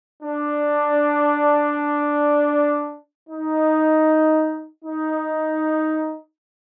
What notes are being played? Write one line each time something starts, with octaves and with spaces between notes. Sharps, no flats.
D4
D#4
D#4